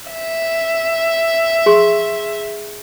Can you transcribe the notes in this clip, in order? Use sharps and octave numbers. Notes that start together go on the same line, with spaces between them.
E5
G#4 C6 C#6